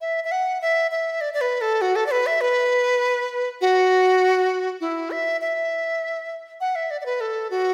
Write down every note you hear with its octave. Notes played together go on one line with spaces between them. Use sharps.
E5
E5
F#5
E5
E5
D5
D5
B4
A4
F#4
A4
D5
B4
E5
B4
F#4
E4
E5
E5
F#5
E5
D5
D5
B4
A4
F#4